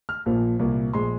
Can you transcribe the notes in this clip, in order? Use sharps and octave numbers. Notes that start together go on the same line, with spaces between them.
F6
A#1 A#2 F3 A#3
C2 A#2 A#3
A#1 G#3 C6